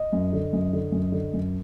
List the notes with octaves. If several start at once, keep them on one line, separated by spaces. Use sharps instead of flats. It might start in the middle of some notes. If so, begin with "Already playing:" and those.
Already playing: D#5
F#2
D3
F#2
D3
F#2
D3
F#2